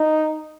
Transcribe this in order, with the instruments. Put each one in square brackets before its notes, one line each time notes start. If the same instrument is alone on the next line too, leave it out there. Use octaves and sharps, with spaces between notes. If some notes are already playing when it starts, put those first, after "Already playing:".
Already playing: [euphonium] D#4